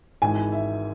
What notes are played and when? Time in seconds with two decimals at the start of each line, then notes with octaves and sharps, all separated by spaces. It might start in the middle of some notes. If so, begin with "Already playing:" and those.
0.22 G#1 G#2 E3 G#5
0.52 E5